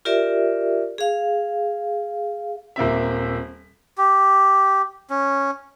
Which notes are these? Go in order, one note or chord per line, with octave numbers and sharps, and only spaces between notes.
F4 G4 A#4 D5 E5
G#4 F5
D#1 A#3 C4 E5
G4
C#4